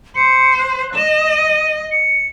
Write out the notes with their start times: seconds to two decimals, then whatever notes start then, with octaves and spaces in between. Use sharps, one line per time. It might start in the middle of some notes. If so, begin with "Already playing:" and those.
0.16 C5 C#7
0.59 F#6
0.95 D#5 E7
1.32 D#7
1.91 C#7